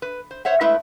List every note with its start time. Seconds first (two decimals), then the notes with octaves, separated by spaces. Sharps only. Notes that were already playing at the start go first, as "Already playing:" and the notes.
0.02 B4
0.31 C5
0.45 C5 C#5 E5 F#5
0.61 G#3 A3 E4 B4 E5